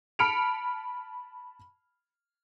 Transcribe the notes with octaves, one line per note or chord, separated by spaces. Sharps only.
A5 B5 F6 C#7 D7 F7